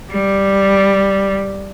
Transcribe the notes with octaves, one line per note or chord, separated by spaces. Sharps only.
G3